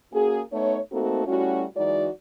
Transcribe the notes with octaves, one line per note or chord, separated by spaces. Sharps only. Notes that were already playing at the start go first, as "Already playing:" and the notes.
A#3 C#4 F#4 G#4
A3 B3 D#4 C#5
A3 A#3 C4 D#4 F#4 A4
G3 A3 C#4 E4 F#4
E3 F#3 G#3 D#4 F#4 D5